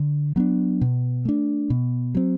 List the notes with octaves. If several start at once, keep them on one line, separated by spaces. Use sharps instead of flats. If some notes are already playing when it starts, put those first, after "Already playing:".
Already playing: D3
F#3 B3 D4
B2
A3 D4
B2
F#3 C4